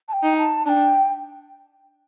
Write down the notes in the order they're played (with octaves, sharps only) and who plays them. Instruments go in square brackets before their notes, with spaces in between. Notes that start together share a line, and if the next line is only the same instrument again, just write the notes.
[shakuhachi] A5
G5
[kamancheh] D#4
[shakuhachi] A5
[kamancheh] D4 [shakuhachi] G5 A5